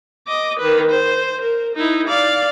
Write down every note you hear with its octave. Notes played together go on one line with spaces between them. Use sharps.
D#5 D6
D#3 B4
C5
A#4
D#4 E4
D5 F5